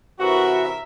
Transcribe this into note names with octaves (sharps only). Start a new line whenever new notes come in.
C3 E3 F#4 A#4 E5